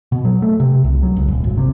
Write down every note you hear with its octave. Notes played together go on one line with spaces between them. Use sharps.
B2
F#3
A3
C3
C2
F#3
C#2
D#1
G#1
C3